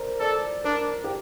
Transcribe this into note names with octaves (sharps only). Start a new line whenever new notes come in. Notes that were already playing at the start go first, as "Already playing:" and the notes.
Already playing: A#4 C5 D5
A4 D5
D4 A#4
G4